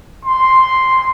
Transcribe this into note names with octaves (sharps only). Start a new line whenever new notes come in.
C6